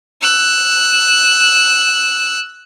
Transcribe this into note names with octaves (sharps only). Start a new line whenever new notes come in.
E6 F#6